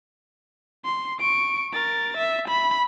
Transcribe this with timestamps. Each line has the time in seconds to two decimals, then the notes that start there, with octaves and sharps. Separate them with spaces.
0.86 C6
1.20 C#6 D7
1.73 A#4 A6
2.18 E5
2.49 B5